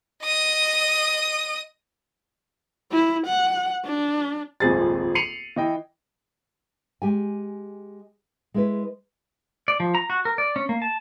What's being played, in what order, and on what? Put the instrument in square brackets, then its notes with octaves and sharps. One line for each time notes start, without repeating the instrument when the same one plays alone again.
[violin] D#5 D#6
[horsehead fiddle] E4
F#5
D4
[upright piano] D#1 G#1 F2 F3 G#4 A6
C7 C#7 D#7 F7 F#7
E3 D#5 G5
[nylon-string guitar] G#3 G4 G#5
G#3 E4 B4
[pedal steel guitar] D5
F3
A#5
F#4
A#4
D5
C#4
A#3
A5